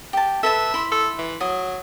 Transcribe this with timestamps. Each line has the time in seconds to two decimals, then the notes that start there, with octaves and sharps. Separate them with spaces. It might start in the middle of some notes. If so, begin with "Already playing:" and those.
0.13 G4 A5
0.43 A4 B4 E5 A5
0.74 E4 B5 C6
0.92 A4
1.18 E3
1.41 F#3 D#6